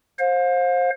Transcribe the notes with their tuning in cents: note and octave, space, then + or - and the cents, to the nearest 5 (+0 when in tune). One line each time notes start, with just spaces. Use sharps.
C5 +20 F5 +35